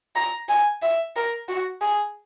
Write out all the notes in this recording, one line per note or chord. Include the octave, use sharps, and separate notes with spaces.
A#5
G#5
E5
A#4
F#4
G#4